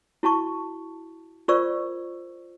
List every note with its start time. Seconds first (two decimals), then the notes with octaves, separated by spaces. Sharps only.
0.23 E4 F#4 A5 C#6
1.48 F4 A#4 C5 D5 C#6 E6